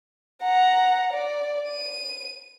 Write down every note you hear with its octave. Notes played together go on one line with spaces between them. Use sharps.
F#5 A#5
D5
D#7